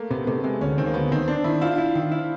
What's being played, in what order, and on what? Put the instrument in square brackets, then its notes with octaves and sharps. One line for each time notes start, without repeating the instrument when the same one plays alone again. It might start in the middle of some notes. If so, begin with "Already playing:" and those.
Already playing: [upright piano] A3 A#3
[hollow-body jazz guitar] C3 [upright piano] B3
[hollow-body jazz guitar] C3 [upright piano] A3
[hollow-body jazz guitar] C3 [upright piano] G#3
[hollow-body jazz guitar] D2 [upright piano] C#4
[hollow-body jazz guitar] D#3 [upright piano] C4
[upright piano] A#3
[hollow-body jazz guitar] D2 [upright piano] B3
[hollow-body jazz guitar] D#3 [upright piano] C4
[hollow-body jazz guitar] C4 [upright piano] D4
[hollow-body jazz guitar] D#3 [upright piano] E4
[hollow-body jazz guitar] E4 [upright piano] F4
[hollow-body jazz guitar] E4
D#3
E4